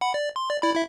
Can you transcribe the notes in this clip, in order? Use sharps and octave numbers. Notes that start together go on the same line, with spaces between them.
F#5 B5
D5
C6
D5
E4 D5 B5
E4 E5